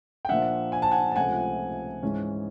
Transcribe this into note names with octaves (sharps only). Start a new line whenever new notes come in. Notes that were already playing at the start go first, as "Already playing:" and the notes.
G5
A#2 F3 A#3 D4 E5 F#5
G#5
A5
F#5 G#5
A5
C#2 C3 F3 A3 C#4 F#5 G#5
G#2 E3 G#3 C#4